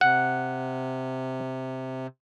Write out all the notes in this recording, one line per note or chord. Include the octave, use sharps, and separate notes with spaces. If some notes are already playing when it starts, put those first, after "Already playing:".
C3 F#5